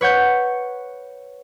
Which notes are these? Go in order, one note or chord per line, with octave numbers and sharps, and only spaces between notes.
B4 C#5 F#5 G6